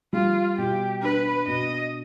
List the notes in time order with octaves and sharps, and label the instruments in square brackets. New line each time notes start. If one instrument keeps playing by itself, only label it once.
[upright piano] G3 [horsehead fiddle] F4
[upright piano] B2 [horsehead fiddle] G4
[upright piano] D4 [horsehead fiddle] B4
[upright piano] B2 [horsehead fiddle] D#5